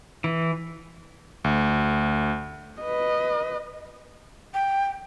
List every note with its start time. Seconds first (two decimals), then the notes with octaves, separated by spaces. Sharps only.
0.24 E3
1.44 D2
2.82 B4 D#5
4.54 G5